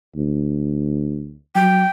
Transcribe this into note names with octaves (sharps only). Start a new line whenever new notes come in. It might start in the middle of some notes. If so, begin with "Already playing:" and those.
D2
F#3 G5